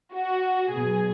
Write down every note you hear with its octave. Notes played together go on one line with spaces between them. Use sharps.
F#4
B2 F#3 G#4